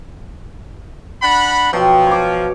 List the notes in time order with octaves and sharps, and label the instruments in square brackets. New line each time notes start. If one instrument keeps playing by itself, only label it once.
[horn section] D4 F#5 B5
[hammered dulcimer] B2 F#3 G5 [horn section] F3
[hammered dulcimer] C#5 D6